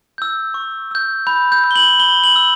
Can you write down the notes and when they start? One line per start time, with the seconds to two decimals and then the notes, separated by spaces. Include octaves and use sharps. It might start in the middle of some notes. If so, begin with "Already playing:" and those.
0.18 E6 G6
0.54 C#6
0.91 E6 G6
1.27 B5 G6
1.52 G6
1.64 E6 G6
1.71 G7
1.75 F#7
1.99 B5 G7
2.24 F#7
2.36 E6